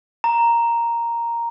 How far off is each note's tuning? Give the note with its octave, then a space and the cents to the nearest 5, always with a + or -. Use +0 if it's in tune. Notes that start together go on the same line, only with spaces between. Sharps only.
A#5 +0